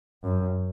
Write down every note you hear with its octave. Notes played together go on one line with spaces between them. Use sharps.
F#2